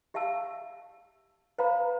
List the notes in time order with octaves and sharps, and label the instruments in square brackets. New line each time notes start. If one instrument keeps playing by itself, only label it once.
[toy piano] G4 E5 F5 A5 E6
B4 C5 F5 A#5 B5